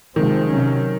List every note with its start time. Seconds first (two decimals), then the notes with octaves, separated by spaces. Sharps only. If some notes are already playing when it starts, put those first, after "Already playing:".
0.16 C3 D#3 F3 G#3 C4
0.50 C3 F#3 C#4